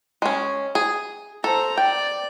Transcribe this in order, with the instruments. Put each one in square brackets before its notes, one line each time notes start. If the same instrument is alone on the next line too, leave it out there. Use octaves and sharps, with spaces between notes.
[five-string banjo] G#3 C#4
G#4
[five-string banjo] A4 [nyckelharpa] C5 A#5
[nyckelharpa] D5 [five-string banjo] G5